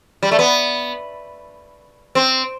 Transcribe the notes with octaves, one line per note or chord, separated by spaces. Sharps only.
G3
A3
B3
C4